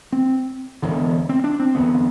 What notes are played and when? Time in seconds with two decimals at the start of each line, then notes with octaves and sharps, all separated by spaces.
0.12 C4
0.82 E1 E2 D3
1.29 C4
1.44 D4
1.60 C4
1.75 F#1 E2 D3 B3